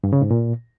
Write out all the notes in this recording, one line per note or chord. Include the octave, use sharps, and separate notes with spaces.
G2
C#3
G#2
A#2